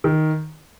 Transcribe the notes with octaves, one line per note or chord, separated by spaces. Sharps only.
D#3